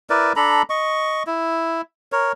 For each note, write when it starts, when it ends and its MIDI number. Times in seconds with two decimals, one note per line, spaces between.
0.10 0.33 64
0.10 0.33 70
0.10 0.33 71
0.10 0.33 74
0.36 0.62 62
0.36 0.62 69
0.36 0.62 82
0.36 0.62 83
0.70 1.23 75
0.70 1.23 85
1.27 1.81 64
2.12 2.32 70
2.12 2.32 73